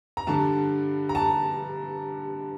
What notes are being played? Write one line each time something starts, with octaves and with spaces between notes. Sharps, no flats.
A#5
G2 D3 G3 A5
A#5
A5